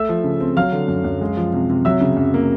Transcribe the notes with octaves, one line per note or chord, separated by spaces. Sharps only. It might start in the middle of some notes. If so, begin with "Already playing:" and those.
Already playing: A3 E5 E6
F3
C#3
C4
F#3 F5 F6
D3
F#2
F#2
G#3
F3
C3
C3
F#3 E5 E6
C#3
F#2
A#3